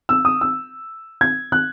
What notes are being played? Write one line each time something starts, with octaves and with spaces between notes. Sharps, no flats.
E6
D#6
E6
G#6
F#6